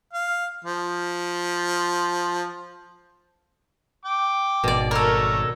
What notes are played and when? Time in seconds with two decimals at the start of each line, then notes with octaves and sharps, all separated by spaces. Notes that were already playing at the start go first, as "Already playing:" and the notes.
0.13 F5
0.65 F3
4.05 G5 D6
4.64 G#1 B2 D5
4.91 A3 A4 A#4 C#5